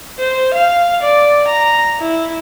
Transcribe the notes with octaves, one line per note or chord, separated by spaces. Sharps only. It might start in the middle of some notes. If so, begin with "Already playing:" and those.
C5
F5
D5
A#5
E4